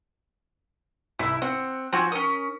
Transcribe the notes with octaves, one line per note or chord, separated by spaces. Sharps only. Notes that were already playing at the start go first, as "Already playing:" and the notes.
C2 E4 E5
C4 F#5
F3 C4 F#4 G#5
C#4 A#4 D#6